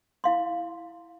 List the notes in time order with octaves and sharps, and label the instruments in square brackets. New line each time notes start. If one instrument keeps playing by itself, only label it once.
[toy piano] E4 F5 C6